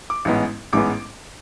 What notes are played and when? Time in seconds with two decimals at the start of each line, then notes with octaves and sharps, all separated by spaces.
0.10 D6
0.25 A1 G#2 G#3 B3
0.73 A1 G#2 G#3 B3 D6